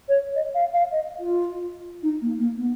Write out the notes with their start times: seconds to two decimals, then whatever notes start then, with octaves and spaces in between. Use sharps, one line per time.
0.09 C#5
0.35 D#5
0.55 F5
0.73 F5
0.92 D#5
1.20 F4
2.03 D#4
2.21 A#3
2.39 A#3
2.58 B3